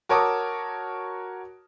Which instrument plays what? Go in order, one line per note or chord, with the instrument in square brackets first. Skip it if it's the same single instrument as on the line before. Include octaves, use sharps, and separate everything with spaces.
[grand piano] F#4 A#4 C#5 A5 D6 D#6